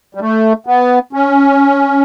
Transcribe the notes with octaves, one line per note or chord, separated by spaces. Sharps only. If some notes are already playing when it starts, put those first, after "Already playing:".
G3
A3
B3
C#4